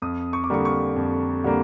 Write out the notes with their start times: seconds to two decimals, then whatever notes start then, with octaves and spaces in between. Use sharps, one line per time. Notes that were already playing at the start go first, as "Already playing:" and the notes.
0.02 F2 D#6
0.33 C#6
0.44 D6
0.50 D3 G3 A#3 C#6
0.65 C#6
0.96 F2
1.44 D3 G3 A#3